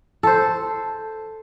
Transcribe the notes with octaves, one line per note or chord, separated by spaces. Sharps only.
A4 C5